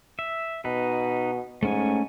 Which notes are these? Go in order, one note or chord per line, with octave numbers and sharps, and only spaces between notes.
E5
B2 D#4 B4
G#2 A3 C#4 G#5